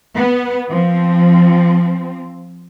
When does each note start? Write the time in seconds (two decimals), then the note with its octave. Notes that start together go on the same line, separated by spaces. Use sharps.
0.16 B3
0.70 F3 C4